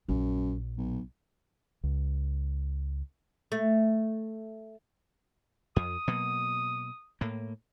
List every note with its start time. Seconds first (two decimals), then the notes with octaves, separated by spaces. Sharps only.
0.09 A#1 F#2
0.77 B1
1.84 C#2
3.52 A3
5.76 F2 D#6
6.08 B2 F#3 A#3
7.21 A2 A#3